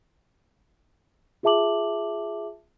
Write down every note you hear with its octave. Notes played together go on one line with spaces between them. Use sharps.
F4 G#4 E5 A5 D6 F#7